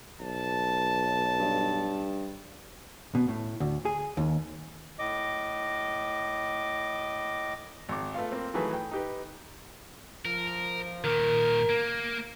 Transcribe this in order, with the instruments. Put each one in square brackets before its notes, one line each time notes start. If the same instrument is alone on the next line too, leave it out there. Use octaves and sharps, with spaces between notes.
[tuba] B1 [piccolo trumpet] A5
[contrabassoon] G2
[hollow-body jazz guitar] B2
A2
D2
G#4
D#2
[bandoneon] A2 D#5 D6
[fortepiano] G#1 D6
A3 B3 F4 F5
A#3 C4
D#3 E3 F#3 A3 G#4 B4
G5
D#4 G4 B4
[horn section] F3 [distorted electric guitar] A#4
[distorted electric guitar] A#2 D#3 [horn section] A#4
[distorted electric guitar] A#3